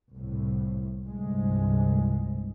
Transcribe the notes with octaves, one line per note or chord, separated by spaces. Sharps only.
C2 A2
G1 C2 G2 C3 G#3